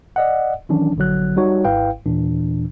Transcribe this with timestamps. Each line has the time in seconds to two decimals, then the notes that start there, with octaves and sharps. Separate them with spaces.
0.16 D5 D#5 F#5
0.69 D#3 E3 F#3 C#4 D4
0.96 A#1 D3 F#3 F#6
1.36 G3 D#4 F#4 C#5
1.65 G#1 G#2 E4 B4 F5 G5
2.06 D#2 A#2 E3 D4